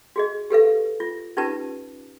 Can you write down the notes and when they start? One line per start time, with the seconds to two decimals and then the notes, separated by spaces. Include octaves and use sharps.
0.16 F#4 G#4 D#5
0.50 G4 A4 B4 F5
1.00 F4
1.37 C#4 D#4 F4 G4 B4 A5